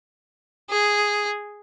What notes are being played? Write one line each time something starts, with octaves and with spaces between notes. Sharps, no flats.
G#4